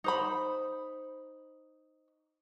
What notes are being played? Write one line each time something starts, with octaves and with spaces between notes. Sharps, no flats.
D#4 C5 B5